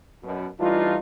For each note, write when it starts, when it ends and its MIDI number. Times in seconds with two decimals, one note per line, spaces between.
0.23 0.47 42
0.23 0.47 47
0.60 0.96 52
0.60 0.96 55
0.60 0.96 57
0.60 0.96 62
0.60 0.96 63
0.60 0.96 65